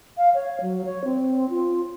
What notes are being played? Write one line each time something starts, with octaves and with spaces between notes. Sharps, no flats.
F5
C#5
F#3
C#5
C4
F4